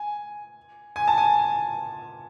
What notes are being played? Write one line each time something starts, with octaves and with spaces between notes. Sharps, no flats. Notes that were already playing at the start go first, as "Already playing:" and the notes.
Already playing: G#5
G#5
A5
G#5